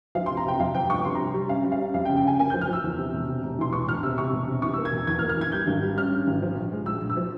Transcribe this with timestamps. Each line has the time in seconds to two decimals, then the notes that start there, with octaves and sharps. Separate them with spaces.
0.15 F3 F5
0.26 C3 C6
0.37 A#5
0.45 C3 G5
0.59 F2 F5
0.75 F3 G5
0.89 G1 C#6
1.05 C3 C6
1.15 G3 A#5
1.34 G3
1.49 C#4 F5
1.64 G3
1.72 F5
1.79 C#4
1.94 F2 F5
2.05 G5
2.09 C#3
2.16 G5
2.24 C#3 G#5
2.39 A#3 G#5
2.50 F3 G6
2.61 F6
2.68 F3 E6
2.84 E2
2.99 C3
3.13 E1
3.28 C3
3.43 E1
3.59 E3 C6
3.73 E1 C#6
3.88 E1 F6
4.03 C3 E6
4.18 C3 C#6
4.33 E1
4.48 C3
4.62 E3 C#6
4.74 A#3 E6
4.85 G#6
4.93 E1
5.07 E2 G#6
5.19 F6
5.22 A#3
5.29 F6
5.37 E3 G#6
5.52 G3 G6
5.67 G#1
5.82 G3
5.97 C#4 F6
6.11 G2
6.27 G#1
6.42 F3
6.57 A#1
6.72 G#3
6.86 A#1 E6
7.01 A#1
7.10 E6
7.17 F3